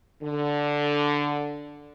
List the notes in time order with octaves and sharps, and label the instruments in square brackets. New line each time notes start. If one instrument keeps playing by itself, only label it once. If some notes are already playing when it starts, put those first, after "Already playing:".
[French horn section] D3